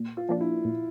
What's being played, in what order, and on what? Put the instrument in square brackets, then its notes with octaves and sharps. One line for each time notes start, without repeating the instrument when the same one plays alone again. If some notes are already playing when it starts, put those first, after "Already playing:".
Already playing: [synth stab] A#2
[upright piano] F4
[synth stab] F3 A#3 D4
[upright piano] E4
[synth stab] A#2